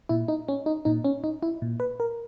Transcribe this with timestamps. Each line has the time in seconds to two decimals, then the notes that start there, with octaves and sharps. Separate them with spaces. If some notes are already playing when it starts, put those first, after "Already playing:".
0.09 A#2 E4
0.28 D#4
0.48 C#4
0.66 D#4
0.85 A#2 D#4
1.04 C#4
1.24 D#4
1.43 E4
1.62 A#2
1.80 B4
2.00 A#4